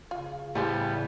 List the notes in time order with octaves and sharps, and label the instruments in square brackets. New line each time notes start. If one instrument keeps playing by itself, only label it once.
[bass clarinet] C#3 [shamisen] F4
[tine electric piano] A2 [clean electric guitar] E3 G3 B3 [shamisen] G4 G#4 C5